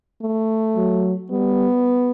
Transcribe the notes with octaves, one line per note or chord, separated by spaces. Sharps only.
A3
F#3
G3 B3